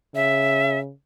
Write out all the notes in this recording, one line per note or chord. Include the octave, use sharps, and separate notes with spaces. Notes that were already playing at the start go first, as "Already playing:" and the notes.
C#3 E5